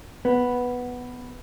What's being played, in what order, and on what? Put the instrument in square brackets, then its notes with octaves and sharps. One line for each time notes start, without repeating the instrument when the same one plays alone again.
[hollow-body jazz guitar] B3